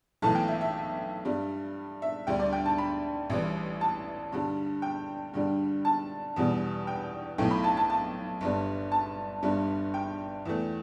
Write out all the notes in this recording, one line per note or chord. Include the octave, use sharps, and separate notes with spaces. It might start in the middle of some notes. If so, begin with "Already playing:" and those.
B1 A2 E3 A3 A5
G5
E5
E5
G2 G3
E5
D2 D3 G3 G5
D5
G5
A5
B5
A1 A2 E3 G3
A5
G2 D3 G3
G5
G2 D3 G3
A5
E2 B2 G3
G5
B1 A2 A3 G5
B5
A5
A5
A5
G1 G2 G3
A5
G1 G2 G3
G5
E2 E3 A3